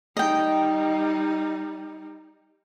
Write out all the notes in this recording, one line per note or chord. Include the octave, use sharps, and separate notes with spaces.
G3 D#4 D#5 G5